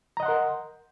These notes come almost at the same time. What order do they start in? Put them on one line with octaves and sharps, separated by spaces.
A#5 D#5 F#5 C6 A#4